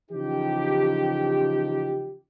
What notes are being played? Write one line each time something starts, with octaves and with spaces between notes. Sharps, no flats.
C#3 E3 F3 D#4 G4